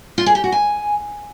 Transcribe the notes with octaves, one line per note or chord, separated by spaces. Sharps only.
F4
G#4
G4
F#4
G#5